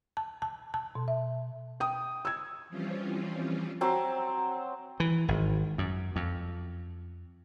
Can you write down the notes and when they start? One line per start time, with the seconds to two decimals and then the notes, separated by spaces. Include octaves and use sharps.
0.17 A5
0.42 A5
0.74 A5
0.95 B2
1.08 E5
1.80 G5 D#6
2.25 E6 G#6
2.69 E3 F3 G3 C4 C#4 F4
3.81 F#3 C4 A5
5.00 E3
5.28 G#1
5.78 F#2
6.16 F2